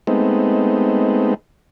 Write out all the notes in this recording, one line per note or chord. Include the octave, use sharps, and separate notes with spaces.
G#3 A3 B3 C4 D#4